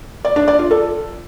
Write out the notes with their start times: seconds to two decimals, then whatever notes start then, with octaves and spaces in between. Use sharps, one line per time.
0.25 D5
0.36 D4
0.48 D5
0.59 F4
0.71 A4